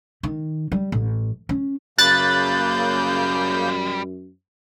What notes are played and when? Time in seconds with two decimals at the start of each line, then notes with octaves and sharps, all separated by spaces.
0.23 D#3
0.72 G3
0.92 A1
1.49 C#4
1.98 F#2 C#3 G3 A#3 B4 F#6 G6 A6